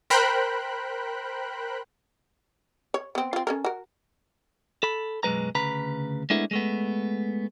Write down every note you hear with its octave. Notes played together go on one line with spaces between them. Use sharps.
A#4 C5 G5 B5 F#6
C#5
B3 C4
C4 F4
C#4 A4 A#4
F#4 A#4
A4 B5
B1 F#2 G#3 B4 A#5
D2 C#3 B4 A#5 B5
G#3 A3 B3 D4 E4 A#4
G#3 A3 B3